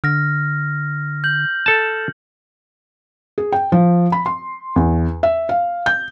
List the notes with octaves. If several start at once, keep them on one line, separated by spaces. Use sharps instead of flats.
D3 F6 A#6
G6 F#7
A4 A5
G#4
G5
F3
B5
C6
E2
E5
F5
G6